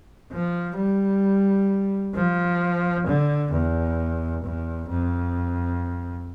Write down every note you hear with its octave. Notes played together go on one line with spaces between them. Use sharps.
F3
G3
F3
D3
E2
E2
F2